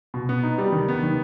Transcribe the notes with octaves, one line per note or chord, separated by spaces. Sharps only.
B2
B3
D#4
G3
D#3
B3
D#3